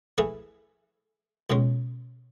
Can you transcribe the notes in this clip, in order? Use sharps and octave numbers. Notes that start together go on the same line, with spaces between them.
E3 A3 E4 G#4
C#2 B2 G#3 C#4